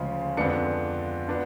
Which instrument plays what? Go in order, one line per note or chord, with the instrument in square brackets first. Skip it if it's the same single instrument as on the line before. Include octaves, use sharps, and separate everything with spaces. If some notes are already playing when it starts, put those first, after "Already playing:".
Already playing: [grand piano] D2 C#3 F3 G#3
F2 D3 G#3 B3 D4 C#7
B3 D4